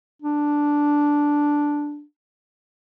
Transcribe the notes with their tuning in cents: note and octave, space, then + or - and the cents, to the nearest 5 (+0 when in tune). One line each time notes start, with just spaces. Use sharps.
D4 -5